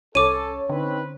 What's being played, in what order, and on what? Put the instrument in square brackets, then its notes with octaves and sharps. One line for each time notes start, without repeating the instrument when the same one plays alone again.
[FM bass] C2 [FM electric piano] C#4 C#5 [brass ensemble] A4 [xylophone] D6 D#7
[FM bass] D3 [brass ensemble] C4 D#4 B4